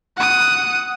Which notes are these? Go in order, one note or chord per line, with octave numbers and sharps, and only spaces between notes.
F#5 D#6